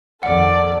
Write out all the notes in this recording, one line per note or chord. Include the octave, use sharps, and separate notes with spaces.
A#1 F2 D#3 A4 D5 F#5